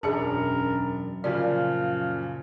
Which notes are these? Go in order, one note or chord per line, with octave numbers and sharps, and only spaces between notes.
E1 F#2 D4 G#4 A#4 A5 C#7
A#2 C#3 F3 D5 F5